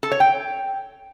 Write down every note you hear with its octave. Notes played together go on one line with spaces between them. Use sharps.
A4
C#5
G5